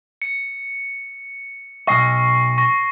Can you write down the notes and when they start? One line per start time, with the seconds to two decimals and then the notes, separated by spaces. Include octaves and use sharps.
0.22 C#7
1.87 B1 D#5 C#6 A#6 C7
2.58 C#6 A#6